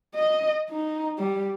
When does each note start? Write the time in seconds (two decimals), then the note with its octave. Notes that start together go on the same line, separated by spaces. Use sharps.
0.15 D#5
0.69 D#4
1.18 G3